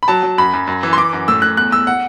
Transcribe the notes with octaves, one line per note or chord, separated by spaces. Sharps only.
B5
F#3 A5
F#3
F#2 B5
F#2
F#2
E3
C6
E3 D6
F#2
A2 E6
A2 F#6
E2 F#6
E2 E6
F#5